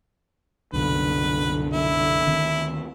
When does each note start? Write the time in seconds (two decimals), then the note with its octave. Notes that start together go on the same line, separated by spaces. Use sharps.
0.73 C2 F#2 B2 D3 B4
1.73 E4
2.27 D2 D#3 C4